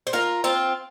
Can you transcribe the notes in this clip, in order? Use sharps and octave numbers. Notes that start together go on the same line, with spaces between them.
C5
F4 A#4
C4 F4